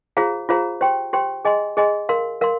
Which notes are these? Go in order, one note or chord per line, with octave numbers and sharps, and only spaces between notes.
F4 G#4 C5 F5 A#5
F4 G#4 C5 F5 A#5
G4 C5 G5 C6
G4 C5 G5 C6
G#4 D#5 G#5 C6
G#4 D#5 G#5 C6
A#4 F5 C6
A#4 F5 C6